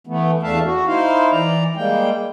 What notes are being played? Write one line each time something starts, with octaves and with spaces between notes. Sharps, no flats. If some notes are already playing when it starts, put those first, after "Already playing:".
E3 A3 B3
E2 A3 D4 E5 F5 A5
F#4
D#4 E4 C5 F5
E3 D5 A#5
G3 G#3 A#3 G5